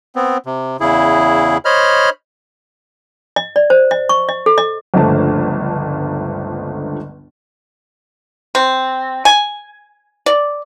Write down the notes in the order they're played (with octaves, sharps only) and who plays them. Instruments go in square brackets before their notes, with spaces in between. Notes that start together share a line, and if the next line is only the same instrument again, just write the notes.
[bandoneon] B3 C4
C3
E2 C#3 E4 G#4
C5 C#5 D#5 B5 F6
[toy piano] D#5
D5
C5
D#5
C#6
D#5
A4
D#5
[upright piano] G1 C#2 D3 F3 A3 A5
[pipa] C4
G#5
D5